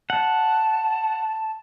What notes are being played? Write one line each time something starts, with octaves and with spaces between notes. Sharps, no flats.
F#5 A5